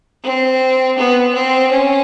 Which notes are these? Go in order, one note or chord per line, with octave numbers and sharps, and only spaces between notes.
C4
B3
C4
C#4